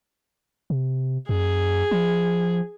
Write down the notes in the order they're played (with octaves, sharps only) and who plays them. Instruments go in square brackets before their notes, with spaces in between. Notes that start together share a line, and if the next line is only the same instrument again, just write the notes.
[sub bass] C3
[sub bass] F#2 [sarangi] G#4
[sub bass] F3